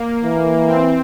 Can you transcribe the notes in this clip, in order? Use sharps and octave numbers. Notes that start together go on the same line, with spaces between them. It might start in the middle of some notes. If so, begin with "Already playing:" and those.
Already playing: A#3
E3
C4